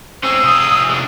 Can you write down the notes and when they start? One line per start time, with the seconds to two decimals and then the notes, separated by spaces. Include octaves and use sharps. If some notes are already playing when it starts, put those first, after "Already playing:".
0.24 C4 C#4 G#4 C5 E6
0.44 C3 F4 D#6
0.89 G#3 D4